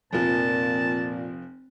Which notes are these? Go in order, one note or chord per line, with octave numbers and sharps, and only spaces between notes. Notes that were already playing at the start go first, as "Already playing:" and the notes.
F1 A#2 F3 C4 A5